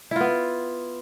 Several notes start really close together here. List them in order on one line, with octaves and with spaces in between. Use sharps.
E4 F4 B3